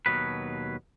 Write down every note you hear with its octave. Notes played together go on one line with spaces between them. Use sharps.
D#2 B2 F#3 B4